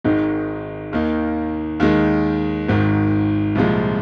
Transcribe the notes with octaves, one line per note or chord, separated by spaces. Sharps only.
G#1 G#2 D#3 G#3 D#4
D#2 D#3 A#3 D#4
D#2 D#3 G#3 D#4
G#1 G#2 D#3
C2 A#2 F3 G#3